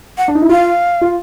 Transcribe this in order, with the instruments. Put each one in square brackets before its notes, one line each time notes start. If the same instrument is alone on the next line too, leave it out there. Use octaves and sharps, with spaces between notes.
[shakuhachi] F#5
[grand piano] D4
D#4
E4
[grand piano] F4 [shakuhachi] F5
[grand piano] F4